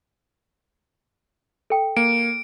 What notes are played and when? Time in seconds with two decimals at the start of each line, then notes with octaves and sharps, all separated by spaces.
1.70 A4 G5
1.97 A#3 D7